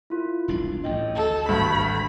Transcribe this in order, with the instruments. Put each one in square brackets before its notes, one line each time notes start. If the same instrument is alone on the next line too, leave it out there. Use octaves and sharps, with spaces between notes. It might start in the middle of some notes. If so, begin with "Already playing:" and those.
[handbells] E4 F4 A#4
[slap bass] E1 C2 D4
[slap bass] A1 A2 [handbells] D#5 G5
[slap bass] D2 [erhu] A4
[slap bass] G#1 [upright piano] D2 G2 [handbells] A3 C#6 [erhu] B5